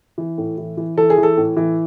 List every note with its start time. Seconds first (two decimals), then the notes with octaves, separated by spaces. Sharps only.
0.18 E3
0.38 A2
0.58 E3
0.77 E3
0.97 E3 A4
1.10 G#4
1.18 E3
1.23 A4
1.37 A2
1.57 E3